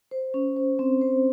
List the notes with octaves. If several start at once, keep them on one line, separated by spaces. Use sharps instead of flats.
C5
C#4
C5
C4
C5